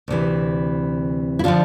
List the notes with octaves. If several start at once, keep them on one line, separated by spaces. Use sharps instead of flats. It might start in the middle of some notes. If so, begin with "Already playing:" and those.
D2 C3 E3
E4
D3 F3 D4 F4